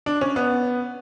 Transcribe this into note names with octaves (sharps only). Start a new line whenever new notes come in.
D4
C#4
B3